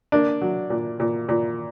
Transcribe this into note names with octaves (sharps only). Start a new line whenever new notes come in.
A#3 D4
F#3
A#2
A#2
A#2